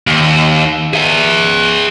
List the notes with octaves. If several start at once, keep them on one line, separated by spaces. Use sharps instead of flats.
D#2
G#4 E5